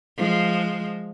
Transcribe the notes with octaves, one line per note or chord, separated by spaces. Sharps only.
F3 G#3